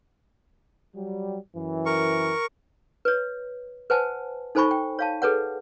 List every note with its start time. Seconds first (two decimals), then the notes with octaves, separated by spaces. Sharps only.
0.95 F#3 G3
1.55 F#2 E3
1.86 A#4 C#6
3.05 B4 C#5
3.90 B4 C5 F#5 G#5 A5
4.55 D#4 A4 C5 G#5 B5 C#6
4.71 G5
4.99 C#5 F5 A5
5.22 G#4 A4 B4 C#5 F#5